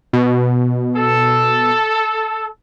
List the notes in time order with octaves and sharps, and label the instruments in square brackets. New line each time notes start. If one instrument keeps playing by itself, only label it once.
[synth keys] B2
[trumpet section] A4